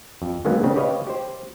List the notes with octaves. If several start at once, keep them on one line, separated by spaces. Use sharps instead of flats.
F2
D3 D#3 F#3 G#3 A#3 B3
C#3 C4 D4
G4 B4 C#5 D#5 F5
G4 C5